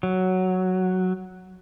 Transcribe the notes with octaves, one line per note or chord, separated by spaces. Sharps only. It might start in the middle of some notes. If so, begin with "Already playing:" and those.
F#3